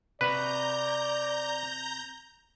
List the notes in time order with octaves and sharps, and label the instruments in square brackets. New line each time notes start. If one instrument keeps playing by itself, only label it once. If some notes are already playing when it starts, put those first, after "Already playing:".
[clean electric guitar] C3 F#4 B5 [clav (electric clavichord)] B4 [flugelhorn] D5 [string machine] A#5 G6